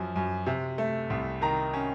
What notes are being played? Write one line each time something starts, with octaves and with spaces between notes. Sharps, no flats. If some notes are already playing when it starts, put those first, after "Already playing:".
Already playing: F#2 F3
F#2
C3
A3
C2
D#3 A#5
C#4